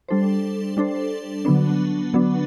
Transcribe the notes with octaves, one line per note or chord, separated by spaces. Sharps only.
G3 D4 A4 C5
G3 D4 A4 C5
D3 F#3 B3 D4
D3 F#3 B3 D4